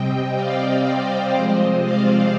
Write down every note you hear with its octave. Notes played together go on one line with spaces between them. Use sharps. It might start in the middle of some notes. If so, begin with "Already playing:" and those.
Already playing: C3 G3 C4 D#5 G5
D5 F5
C5 D#5
C3 F3 G#3 C4 C5 D#5
D5 F5